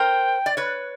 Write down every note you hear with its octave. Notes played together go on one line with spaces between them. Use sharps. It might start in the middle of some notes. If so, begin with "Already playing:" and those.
Already playing: A#4 C5 G5
D5
B4 C#5